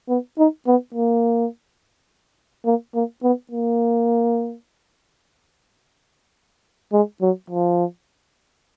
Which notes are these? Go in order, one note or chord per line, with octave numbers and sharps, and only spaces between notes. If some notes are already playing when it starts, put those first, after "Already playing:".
B3
D#4
B3
A#3
A#3
A#3
B3
A#3
G#3
F#3
F3